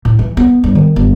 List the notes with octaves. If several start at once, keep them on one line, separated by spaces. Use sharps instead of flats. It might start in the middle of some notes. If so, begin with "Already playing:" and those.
A2
E3
B3
G2
D#3
G1